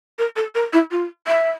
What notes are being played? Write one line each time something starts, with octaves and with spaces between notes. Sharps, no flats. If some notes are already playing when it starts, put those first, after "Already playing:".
A#4
A4
A#4
E4
F4
E5